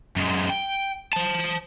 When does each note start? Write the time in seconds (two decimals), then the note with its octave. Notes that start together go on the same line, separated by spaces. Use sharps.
0.16 F#2 G#3
0.50 G5
1.13 C5 A5